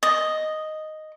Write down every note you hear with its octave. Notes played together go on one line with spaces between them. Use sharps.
D#5